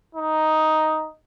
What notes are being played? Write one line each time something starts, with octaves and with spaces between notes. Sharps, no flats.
D#4